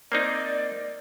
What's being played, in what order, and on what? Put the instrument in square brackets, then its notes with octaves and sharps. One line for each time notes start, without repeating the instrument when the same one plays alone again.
[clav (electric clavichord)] A#3 C4 D#4 [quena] D5